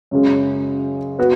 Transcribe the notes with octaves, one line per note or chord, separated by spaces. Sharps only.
F#2 C#3 G#3 C#4
B3 F#4 B4